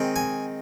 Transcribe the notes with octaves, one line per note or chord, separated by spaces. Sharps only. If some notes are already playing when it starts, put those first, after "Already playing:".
Already playing: D#3 G#3 C4
G#5